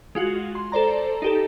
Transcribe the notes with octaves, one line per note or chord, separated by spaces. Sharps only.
G#3 F4 F#4
C6
A4 C5 D5 A#5
D#4 G4 A4